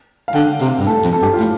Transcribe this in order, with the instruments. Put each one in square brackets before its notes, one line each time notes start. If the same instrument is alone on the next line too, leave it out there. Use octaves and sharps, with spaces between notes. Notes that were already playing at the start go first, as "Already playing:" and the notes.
[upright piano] F5
[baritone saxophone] D3 [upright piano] G5
[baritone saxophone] C3 [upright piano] F5
[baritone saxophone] G2
[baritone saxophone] A2 [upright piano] A4
[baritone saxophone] F2
[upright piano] A4
[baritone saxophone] G2 [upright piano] G4
[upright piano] F4
[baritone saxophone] A2